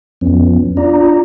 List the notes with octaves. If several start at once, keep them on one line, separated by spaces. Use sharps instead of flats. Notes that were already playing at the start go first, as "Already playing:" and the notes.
F2 F3 B3 C#4
D4 F4 D5 A#5